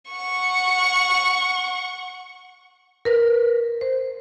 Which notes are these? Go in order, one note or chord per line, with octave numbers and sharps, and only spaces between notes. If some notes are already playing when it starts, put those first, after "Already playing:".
F#5 C#6
A#4 B4
C5